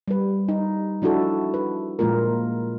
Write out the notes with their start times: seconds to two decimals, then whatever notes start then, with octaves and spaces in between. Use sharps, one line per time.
0.08 G3 B4
0.48 D#4
1.02 F3 D4 E4 F#4 A4
1.54 B4
1.99 A#2 F3 G#3 A#3 F4 A#4